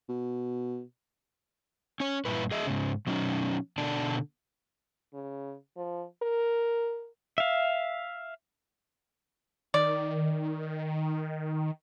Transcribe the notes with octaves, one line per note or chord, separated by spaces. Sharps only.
B2
C#4 C#5
G2 A#2 E4 B4
G#4 D#5 E5
G#2 C#3
B2 F#3 C#4 D#4
B2 D3 D4 D5 A5
C#3
F3
A#4
E5 F5
D#3 D5